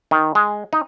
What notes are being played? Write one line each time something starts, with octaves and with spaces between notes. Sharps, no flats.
D#3
G#3
D#4